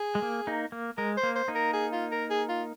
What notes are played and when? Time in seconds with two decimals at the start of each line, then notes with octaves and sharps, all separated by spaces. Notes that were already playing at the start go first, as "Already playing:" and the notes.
Already playing: G#4
0.15 G#3
0.22 A#3
0.47 A#3 D#4
0.72 A#3
0.97 G#3 A#4
1.17 C5
1.23 A#3
1.35 C5
1.48 A#3 D#4
1.55 A#4
1.73 G#4
1.92 F4
2.12 A#4
2.30 G#4
2.49 F4